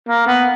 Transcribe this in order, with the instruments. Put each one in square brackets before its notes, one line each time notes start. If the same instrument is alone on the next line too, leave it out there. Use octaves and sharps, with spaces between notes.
[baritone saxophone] A#3
B3